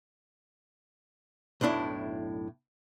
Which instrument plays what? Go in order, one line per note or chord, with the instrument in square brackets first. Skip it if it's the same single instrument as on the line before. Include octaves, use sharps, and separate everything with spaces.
[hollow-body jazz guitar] B1 F#2 A2 D4 E4